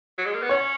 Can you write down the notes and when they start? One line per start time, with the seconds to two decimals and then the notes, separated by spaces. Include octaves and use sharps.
0.18 F#3
0.26 G#3
0.35 A#3
0.42 B3
0.49 C#4 C#5